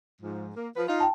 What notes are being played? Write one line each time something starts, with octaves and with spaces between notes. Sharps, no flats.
G#2 F3
A#3
F3 B4
D#4 F4
G5 A5